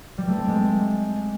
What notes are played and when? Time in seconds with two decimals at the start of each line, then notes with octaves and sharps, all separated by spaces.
0.18 G3
0.28 A3
0.38 C4
0.48 G#3